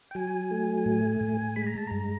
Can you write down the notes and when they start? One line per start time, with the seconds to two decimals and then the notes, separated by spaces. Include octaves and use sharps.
0.11 G5
0.15 F#3 G#5
0.51 A3
0.86 A2
1.21 A2
1.56 G#3 B5
1.67 A#5
1.78 A5
1.87 G2 A#5